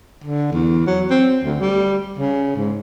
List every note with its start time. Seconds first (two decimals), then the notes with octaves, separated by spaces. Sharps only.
0.24 D3
0.52 E2
0.87 F#3
1.10 C4
1.44 D2
1.60 G3
2.18 C#3
2.56 G#2